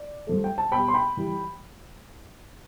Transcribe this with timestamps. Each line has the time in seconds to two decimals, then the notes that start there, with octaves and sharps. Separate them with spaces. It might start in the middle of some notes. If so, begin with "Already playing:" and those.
Already playing: D5
0.27 G2 F3 A3
0.44 G5
0.58 A5
0.72 B2 G3 G5 B5
0.88 C6
0.94 G5 B5
1.17 G2 E3 G3